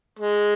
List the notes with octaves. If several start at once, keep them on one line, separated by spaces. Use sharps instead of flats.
G#3